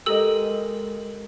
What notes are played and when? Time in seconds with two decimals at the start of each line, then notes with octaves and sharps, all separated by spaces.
0.06 G#3 G4 A4 A#4 D#5 E6